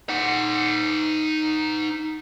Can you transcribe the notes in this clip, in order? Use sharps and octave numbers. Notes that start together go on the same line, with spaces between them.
D#4 F#5